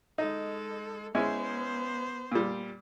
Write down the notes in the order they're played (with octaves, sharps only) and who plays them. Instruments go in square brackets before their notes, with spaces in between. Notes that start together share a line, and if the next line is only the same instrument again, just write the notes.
[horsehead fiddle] G#3 A4 [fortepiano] D#4
[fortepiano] G#3 C#4 E4 [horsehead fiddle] B3 C5
[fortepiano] A#2 G3